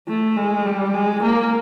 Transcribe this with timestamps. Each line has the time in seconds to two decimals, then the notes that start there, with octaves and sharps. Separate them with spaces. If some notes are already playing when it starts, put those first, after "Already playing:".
0.08 A3
0.37 G#3
0.66 G3
0.94 G#3
1.24 A#3